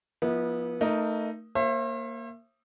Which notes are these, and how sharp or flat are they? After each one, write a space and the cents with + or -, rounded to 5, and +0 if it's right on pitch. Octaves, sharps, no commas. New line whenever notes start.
F3 +0 B3 -30 E4 -40
A3 +25 D#4 +0 A#4 +25
A#3 +0 C5 +45 E5 +25